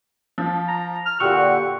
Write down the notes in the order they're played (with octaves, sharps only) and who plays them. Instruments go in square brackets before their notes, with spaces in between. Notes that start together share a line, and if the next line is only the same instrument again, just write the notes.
[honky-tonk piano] F3
[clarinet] A#5
F6
[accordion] A#2 D3 F#4 [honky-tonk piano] G4 E6 F#6 [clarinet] C#6